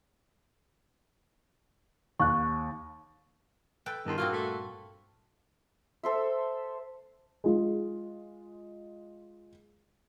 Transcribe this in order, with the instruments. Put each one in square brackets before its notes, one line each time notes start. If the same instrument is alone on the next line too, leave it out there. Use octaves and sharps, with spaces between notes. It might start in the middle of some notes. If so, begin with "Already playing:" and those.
[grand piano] D#2 [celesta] C#6 F#6
[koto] A4 B4 G5
[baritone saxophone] E2 [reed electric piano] G2 A5 C6 [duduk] D#3
[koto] A#2 A#3 C4 [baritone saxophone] F4 [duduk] F#4
[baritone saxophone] A3
[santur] A4 C5 E5
[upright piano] G#3 F4